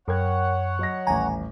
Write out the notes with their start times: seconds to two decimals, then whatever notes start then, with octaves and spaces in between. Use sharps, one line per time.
0.08 F#2 A#4 C#5 F#5 G5 G#6
0.79 F#3 D#5 A#6
1.07 D#1 A1 G#5 A#5